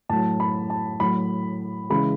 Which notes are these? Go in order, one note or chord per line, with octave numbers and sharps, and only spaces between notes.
A2 F#3 A5
B5
A5
A2 F#3 B5
C#3 E3 G#3 B5